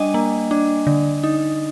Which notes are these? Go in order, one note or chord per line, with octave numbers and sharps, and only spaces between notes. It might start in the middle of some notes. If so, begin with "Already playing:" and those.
Already playing: G3 D4 D#5 G5 G#5
A#3
D4
D3
D#4